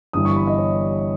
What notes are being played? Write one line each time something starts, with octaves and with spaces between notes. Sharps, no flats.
G1 G2 E3 G3 D#6
C#6
B5
D#5
C#5